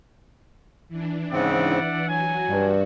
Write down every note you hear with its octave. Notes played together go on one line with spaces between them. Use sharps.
E3 D4
G#2 C#3 C4 D5 E5 F#5
F#3 F#4 G#5
G2